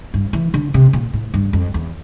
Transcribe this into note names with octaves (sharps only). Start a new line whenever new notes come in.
G2
E3
D3
C3
A#2
A2
G2
F2
E2